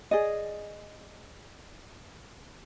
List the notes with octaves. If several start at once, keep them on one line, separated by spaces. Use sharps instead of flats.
G#4 D5 D#5